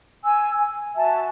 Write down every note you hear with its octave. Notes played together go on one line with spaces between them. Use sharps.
G#5 E6
G#5
F#4 E5 G#5 A5